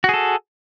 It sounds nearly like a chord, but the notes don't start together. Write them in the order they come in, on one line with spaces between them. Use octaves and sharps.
F#4 G#4 A4